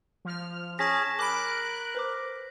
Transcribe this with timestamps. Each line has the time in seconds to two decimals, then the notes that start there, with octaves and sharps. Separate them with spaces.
0.25 F3 F6
0.79 C#4 G#4 A5 A#6 B6
1.19 A#4 B5 D6 F#6 D7
1.95 B4 C5 D6